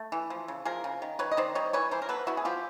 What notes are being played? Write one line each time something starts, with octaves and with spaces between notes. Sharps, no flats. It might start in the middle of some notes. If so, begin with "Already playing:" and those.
Already playing: A3
E3
F3
C#3
F3 G#4 A#4
C#3
D#3
D#3 B4 C#5
D#5
D#3 C5 D5
G3 C#5 D#5
E3 B4 C#5
E3 A#4 C5
A#4
B3 A4 B4
B3 E4 F#4
G#4
F3 F4 G4